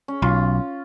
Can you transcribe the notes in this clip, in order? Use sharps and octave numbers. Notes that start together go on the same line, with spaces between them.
C#4
B1 F4